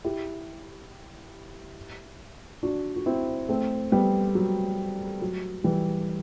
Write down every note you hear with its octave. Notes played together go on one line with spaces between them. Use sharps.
E4 G4
D4 F#4
F#4
C4 E4
A3 C4
G3 B3
F#3
F#3
E3 G3